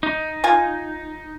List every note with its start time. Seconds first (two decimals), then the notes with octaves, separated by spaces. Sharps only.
0.03 D#4
0.44 F4 G#5